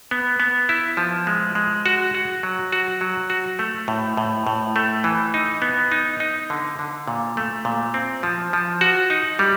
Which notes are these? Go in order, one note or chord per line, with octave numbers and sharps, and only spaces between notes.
B3
B3
E4
F3
G#3
G#3
F#4
F#4
F#3
F#4
F#3
F#4
A3
A2
A2
A2
A3
E3
D#4
B3
D#4
D#4
D3
D3
A#2
A3
A#2
C4
F3
F3
F#4
D#4
G3